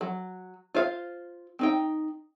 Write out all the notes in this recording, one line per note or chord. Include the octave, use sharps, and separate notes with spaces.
F#3
F4 C5 F5
C4 D#4 G5